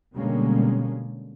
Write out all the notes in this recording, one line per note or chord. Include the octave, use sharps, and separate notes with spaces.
B2 D3 G3 G#3 A#3 C#4